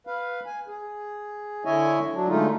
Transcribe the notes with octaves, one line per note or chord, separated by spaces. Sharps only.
B4 F5
G#5
G#4
D3 E4 C#5 D#5 E5 G#5
F#3 D4
D3 G#3 A3 D#4 F4